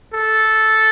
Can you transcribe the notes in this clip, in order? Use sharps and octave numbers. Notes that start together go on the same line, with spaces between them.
A4